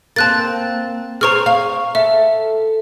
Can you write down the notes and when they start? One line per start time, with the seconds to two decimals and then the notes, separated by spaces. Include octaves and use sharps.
0.16 A#3 C4 A5 F#6 A6
1.21 G#4 C5 A#5 C#6 F6
1.46 F5
1.95 A4 E5